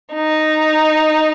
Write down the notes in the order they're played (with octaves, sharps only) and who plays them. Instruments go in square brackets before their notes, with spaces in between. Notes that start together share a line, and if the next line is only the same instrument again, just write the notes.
[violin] D#4